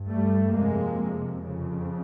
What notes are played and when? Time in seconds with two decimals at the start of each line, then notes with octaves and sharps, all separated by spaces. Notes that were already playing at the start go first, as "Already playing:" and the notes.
Already playing: G2
0.09 G3 A3
0.54 F2 C3 G#3 A#3
1.44 F2 C#3